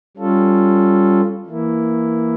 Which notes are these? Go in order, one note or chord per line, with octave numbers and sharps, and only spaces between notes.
G3 C#4 F4 A4
E3 A#3 E4